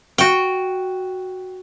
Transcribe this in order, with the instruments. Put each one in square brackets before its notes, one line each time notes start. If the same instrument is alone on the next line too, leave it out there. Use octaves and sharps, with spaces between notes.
[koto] F#4 G5